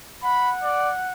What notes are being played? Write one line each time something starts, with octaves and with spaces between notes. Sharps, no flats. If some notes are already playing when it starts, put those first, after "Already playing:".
F#5 B5
D5